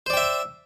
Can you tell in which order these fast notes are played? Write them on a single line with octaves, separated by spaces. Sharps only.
C5 D5 G5 E5